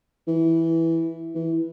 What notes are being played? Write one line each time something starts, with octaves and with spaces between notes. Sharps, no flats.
E3
E3